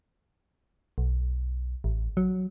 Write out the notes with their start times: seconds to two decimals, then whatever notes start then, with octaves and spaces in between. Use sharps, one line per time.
0.98 B1
1.84 A1
2.17 F#3